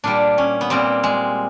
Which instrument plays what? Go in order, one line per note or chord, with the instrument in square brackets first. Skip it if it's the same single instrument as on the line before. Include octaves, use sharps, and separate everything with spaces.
[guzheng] A#2 G3 D4
C#4
B3
A#2 G3 C4
G#3